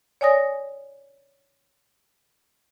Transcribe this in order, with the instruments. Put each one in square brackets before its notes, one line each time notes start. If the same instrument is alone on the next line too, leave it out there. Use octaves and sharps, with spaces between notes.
[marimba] C#5 D5 G#5 D#6 A#6